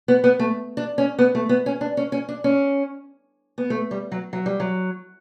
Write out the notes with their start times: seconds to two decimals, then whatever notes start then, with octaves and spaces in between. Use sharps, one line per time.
0.08 B3
0.24 B3
0.39 A3
0.77 D4
0.98 C#4
1.19 B3
1.35 A3
1.49 B3
1.66 C#4
1.81 D4
1.97 C#4
2.12 C#4
2.29 D4
2.44 C#4
3.58 B3
3.70 A3
3.91 G3
4.12 F#3
4.33 F#3
4.46 G3
4.60 F#3